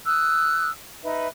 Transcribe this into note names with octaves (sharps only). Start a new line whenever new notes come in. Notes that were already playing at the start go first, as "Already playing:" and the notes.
D#6 E6 F#6
D#4 B4 E5